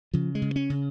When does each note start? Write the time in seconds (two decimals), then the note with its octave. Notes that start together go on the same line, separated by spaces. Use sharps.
0.14 C#3 F3
0.35 G#3
0.42 C#3
0.56 C#4
0.70 C#3